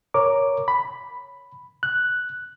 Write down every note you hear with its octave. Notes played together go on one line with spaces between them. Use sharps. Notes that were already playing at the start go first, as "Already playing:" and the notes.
A#4 C#5 D6
B5
F#6